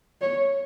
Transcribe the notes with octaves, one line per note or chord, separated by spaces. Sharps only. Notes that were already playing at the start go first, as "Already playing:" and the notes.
C#5